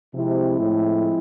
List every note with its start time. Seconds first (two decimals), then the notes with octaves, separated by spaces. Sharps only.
0.14 C3 F3 G#3 C4 E4
0.60 A2